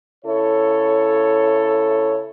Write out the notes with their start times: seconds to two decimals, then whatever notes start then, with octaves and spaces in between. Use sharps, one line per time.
0.24 C#3 E4 A4 C#5